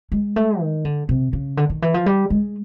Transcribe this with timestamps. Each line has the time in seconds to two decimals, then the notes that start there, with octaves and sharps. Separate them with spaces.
0.12 G#3
0.36 A3
0.60 D#3
0.85 D3
1.09 C3
1.33 C#3
1.57 D3
1.70 D#3
1.82 E3
1.94 F3
2.06 G3
2.30 G#3